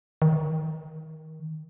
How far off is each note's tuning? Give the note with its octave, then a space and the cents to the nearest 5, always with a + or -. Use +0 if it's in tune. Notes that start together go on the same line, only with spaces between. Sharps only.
D#3 +20